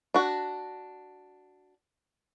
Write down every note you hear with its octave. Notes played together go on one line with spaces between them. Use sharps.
D4 F#4